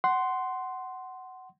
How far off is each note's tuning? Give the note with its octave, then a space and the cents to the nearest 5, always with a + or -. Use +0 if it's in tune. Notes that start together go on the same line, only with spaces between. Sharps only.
F#5 +15 C6 -5